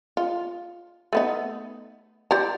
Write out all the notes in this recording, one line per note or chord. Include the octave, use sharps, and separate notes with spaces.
F4
A3 B3 D#4
G4 D5 A#5